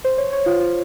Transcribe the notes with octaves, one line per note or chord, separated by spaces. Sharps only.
C5
C#5
C#5
F4
F4